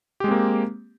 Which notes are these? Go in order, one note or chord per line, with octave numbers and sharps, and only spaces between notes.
G#3 A#3 C4 G4